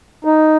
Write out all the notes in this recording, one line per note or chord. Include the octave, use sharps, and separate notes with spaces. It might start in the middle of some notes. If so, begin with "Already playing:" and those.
D#4